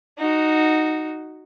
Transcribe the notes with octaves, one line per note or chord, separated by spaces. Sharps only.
D#4 F#4